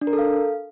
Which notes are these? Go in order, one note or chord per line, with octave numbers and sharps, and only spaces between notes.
D4
A#4
A4
F5